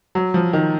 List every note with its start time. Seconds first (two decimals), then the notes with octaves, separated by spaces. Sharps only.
0.15 F#3
0.34 F3
0.53 D#3